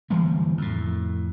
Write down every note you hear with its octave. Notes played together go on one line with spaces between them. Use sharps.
G1 E3 G3 A#3
F2 A2